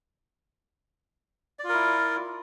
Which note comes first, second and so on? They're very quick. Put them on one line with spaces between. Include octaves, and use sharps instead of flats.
D5 F4 A#4 E4